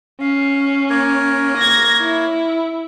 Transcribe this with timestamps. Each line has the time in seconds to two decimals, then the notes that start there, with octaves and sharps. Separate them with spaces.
0.21 C#4 F5
0.90 A#3 A#4 C#5
1.57 G#6 A#6
2.01 E4